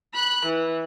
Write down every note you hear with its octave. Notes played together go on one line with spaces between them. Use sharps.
B5 F#6
E3